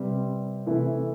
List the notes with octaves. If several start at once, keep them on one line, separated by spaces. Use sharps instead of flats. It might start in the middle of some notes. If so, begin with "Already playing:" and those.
Already playing: C3 G3 C4 G4 B4
C3 E3 A3 E4 B4